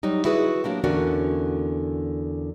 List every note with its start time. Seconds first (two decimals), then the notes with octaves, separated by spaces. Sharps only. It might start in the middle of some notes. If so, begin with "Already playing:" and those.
0.03 F#3 G3 D#4
0.25 E4 F#4 G#4 B4
0.64 F#3 A#3 D4 G4
0.84 E2 D3 C#4 D4 F#4 A#4